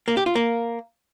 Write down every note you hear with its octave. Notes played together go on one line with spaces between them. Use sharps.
A#3
G4
F4
A#3